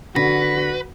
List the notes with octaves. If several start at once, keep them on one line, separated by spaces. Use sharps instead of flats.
D3 F#4 B4 A#6 B6